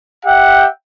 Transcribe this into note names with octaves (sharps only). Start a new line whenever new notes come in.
G4 E5 F#5 G5